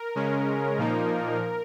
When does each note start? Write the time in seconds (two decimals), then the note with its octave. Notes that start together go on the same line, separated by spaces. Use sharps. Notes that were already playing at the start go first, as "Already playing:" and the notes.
Already playing: A#4
0.15 C#3 G#3 C#4
0.78 A#2 F3 A#3 D#4